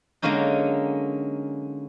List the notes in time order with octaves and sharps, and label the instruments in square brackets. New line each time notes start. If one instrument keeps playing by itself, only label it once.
[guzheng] D3 F#3 G#3 A#3 C#4 D#4